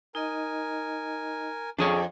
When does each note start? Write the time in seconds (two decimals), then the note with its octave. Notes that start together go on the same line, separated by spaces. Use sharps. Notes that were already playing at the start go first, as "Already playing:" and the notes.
0.15 D#4 A#4 D#5 G#5
1.78 F2 D4 G#4 C#5